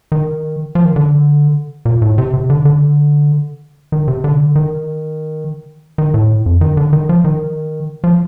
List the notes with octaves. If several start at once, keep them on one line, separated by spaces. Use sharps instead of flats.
D#3
F3
D#3
D3
A#2
A2
C3
C3
D3
D3
D#3
C3
D3
D#3
D#3
A2
F2
D#3
D3
D#3
F3
D#3
F3